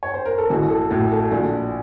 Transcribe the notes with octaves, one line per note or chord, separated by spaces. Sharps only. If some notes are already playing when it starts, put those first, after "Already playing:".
C#5
C5
A#4
A4
A1 F#4
A4
A2 F#4
A4
A#1 F#4